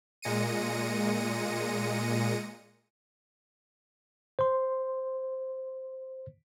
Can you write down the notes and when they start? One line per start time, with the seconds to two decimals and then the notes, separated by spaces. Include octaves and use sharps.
0.22 A#2 G#3 A#6 C#7 D#7
4.39 C5 C6